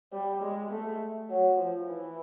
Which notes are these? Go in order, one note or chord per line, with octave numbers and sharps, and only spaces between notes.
G3
G#3
A3
F#3
F3
E3